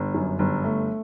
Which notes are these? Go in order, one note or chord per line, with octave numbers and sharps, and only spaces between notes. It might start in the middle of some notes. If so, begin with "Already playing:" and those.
Already playing: G1
F#2
G1
A3